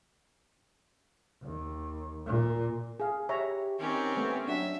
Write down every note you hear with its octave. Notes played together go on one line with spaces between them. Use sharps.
D#2
A#2
G#4 F5
G4 C#5 E5 A#5
D#3 C4 C#4 G4
A3 B3
F#3 D4 E5 F#5